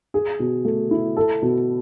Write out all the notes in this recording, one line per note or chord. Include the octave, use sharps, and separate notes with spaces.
G#4
B2
A3
E4
A4
B2